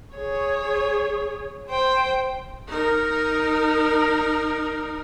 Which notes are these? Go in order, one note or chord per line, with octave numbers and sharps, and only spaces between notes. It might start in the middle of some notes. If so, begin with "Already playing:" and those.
G#4 C#5
C5 G5
D#4 A#4